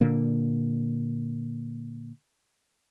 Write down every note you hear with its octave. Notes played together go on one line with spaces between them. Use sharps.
A#2 D3 A#3